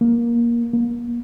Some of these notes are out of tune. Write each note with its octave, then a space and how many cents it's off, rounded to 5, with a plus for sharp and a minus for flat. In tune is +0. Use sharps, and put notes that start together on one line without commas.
A#3 +15
A#3 +30